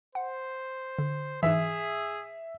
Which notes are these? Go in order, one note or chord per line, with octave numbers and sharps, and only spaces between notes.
C5 F#5
D3
G#2 E3 G#4 E5